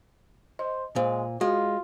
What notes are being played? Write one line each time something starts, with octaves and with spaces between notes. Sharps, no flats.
C5 D#5
A#2 G#3 C5
G#3 F4 F#4